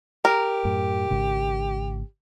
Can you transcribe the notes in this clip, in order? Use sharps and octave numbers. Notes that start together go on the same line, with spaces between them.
G4 A#4
F#2 A2
G#1 G#2 C#3